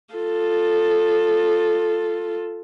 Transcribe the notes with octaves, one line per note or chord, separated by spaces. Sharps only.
F4 A4